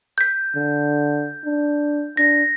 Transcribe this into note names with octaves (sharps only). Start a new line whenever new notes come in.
G6 B6
D3
D4
D4 A#6